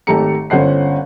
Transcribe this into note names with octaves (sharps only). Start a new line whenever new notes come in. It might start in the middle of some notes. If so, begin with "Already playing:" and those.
G#1 A3 G4 A4 A#5 C#7
G1 C#4 C5 F#5 C7